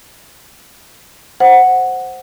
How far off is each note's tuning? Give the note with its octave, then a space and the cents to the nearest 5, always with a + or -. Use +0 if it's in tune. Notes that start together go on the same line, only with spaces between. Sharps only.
C5 +0 F#5 +0